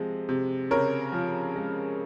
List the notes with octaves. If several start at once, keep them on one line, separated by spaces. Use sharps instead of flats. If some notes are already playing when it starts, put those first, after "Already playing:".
Already playing: C3 F3 G#3
C3
C#3 A#4 C#5
F3
G#3